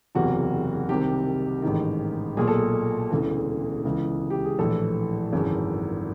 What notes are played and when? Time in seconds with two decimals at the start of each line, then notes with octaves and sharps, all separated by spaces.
0.15 F#1 E2 C3 F#4
0.89 C2 C3 D#3 G4
1.62 A1 G#2 D#3
2.37 B1 A#2 G#4
2.47 A4
2.59 G#4
3.11 E1 D2 C#3 E3
3.85 C#2 C#3 E3
4.30 G4
4.45 G#4
4.59 A#1 A2 E3 A4
5.33 G#1 F#2 C#3 E3